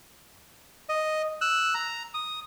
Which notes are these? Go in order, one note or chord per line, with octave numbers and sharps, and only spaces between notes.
D#5
E6 F#6
A#5
D#6